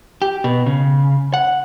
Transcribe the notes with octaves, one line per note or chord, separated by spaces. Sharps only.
G4
B2
C#3
F#5